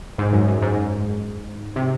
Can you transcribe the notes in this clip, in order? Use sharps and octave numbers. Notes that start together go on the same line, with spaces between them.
G#2
F#2
F#2
G#2
C3